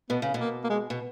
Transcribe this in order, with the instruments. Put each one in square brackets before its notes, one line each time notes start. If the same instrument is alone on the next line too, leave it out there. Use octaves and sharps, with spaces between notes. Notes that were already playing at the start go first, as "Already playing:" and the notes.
[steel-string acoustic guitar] B2 [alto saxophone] B3
[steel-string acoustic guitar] C#3
B2
[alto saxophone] A#3
A#3
G#3
[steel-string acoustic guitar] B2